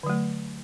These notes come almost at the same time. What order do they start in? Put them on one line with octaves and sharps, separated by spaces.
D3 F#3 A3